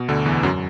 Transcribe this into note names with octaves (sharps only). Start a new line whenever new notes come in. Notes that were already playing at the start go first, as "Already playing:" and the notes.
Already playing: B2
D2 D3
E2 E3
F#2 F#3